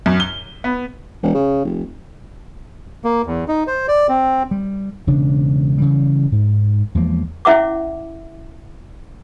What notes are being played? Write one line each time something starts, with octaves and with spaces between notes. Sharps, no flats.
F#2
G7
B3
E1
C#3
F1
A#3
E2
D#4
C5
D5
C4
G3
E1 C#3 D4
C#3 E3 G3
G#2
E2 F3 G#3 A#3
C#4 E4 E5 F#5 D6